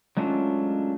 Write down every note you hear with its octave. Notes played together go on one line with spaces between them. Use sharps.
F#3 G#3 A3 C#4 D4 F4